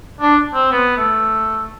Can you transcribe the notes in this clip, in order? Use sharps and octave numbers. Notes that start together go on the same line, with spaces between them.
D4
C4
B3
A3